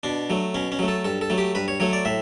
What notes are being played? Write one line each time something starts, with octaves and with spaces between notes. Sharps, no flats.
B2 D4
F#3 A3
B2 C#4
C#4
F#3 A3
A4
G2 A4
A4
F#3 A3
G4
G2 B4
C#5
F#3 A3 C#5
D5
A2 E5